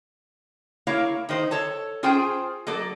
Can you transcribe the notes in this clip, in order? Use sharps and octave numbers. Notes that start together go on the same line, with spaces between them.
A#3 E4 C#5 F5
D#3 D#4 C5
A4 C#5 A5
C#4 F4 G#4 C5 G5
F#3 A#3 A4 D5